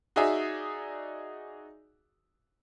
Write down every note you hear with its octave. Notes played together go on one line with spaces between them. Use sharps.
D#4 F#4 G#4 D5 E5 G#5